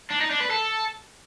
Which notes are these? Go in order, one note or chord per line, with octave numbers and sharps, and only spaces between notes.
D4
D#4
D4
B4
A4